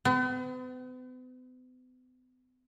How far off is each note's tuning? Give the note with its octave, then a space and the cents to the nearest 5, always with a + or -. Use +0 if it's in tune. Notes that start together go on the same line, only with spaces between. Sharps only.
B3 +45